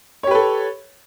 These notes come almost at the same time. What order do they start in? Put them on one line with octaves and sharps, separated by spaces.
C#5 G4 B4 A4